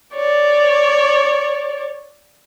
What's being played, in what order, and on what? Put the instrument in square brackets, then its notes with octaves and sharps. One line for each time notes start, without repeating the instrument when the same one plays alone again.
[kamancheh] C#5 D5